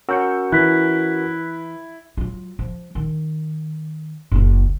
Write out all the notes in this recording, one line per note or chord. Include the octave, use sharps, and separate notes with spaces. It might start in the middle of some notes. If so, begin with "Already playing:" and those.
C#4 F#4 A#4 E6 G6 C#7
E3 E4 F#6 B6
F#3 F4
F3
D#3
F#1 C#2